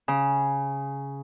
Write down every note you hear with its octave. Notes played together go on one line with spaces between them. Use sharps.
C#3